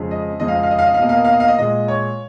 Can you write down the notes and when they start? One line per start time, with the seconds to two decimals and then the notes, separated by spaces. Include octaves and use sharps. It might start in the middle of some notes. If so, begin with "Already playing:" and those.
Already playing: F2 C#3 G#3
0.11 D#5
0.40 F2 C#3 G#3 D#5
0.48 F5
0.55 D#5
0.63 F5
0.71 D#5
0.79 F5
0.86 D#5
0.94 F5
0.99 B2 A#3 D#5
1.09 F5
1.17 D#5
1.25 F5
1.33 D#5
1.40 F5
1.48 D#5
1.58 A#2 G#3 D#5
1.88 C#5